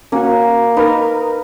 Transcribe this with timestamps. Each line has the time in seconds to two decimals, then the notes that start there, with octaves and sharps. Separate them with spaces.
0.12 A#3 C#4 F#4
0.77 D#4 A#4 B4